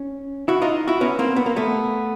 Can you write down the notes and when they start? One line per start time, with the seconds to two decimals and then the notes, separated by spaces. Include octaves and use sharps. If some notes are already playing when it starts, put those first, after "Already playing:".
Already playing: C#4
0.48 E4 F#4
0.61 D#4 F4
0.88 E4 F#4
1.01 B3 C#4
1.19 A#3 C4
1.36 B3
1.46 A#3
1.56 A3 B3